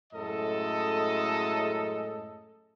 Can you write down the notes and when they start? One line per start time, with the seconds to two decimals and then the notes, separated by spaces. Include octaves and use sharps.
0.13 F#2 A2 G#3 A4 D#5